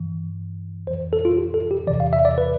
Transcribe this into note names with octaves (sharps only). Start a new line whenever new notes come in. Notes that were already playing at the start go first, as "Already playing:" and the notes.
Already playing: G2 E3
F2 E3 C5
A4
F4
G4
A4
G4
E2 C3 E3 D5
F5
E5
D5
B4